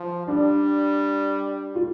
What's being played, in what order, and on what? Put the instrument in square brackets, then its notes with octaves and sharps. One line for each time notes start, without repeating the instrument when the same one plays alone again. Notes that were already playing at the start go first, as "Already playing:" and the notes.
Already playing: [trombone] F3
[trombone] G3 [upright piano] D4
[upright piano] F4